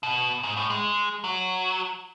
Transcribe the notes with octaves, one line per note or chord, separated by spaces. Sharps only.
B2
G#2
A2
G#3
F#3